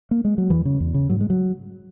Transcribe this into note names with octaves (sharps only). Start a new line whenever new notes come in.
A#3
G#3
F#3
E2 E3
C#3
E2
C#3
G#2 F#3
G#3
F#3